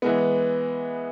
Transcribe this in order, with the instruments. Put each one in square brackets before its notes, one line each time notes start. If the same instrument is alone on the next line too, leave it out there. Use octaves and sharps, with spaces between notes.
[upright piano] E3 G#3 B3